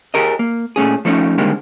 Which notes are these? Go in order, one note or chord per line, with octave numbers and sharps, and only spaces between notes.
G4 G#4 A#4 D#5
A#3
A#2 A3 C#4 G#4
F3 A3 C#4 D#4
D3 D#3 G3 G#3 A#3 C4